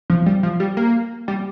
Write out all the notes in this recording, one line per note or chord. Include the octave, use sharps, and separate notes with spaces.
F3
G3
F3
G3
A#3
G3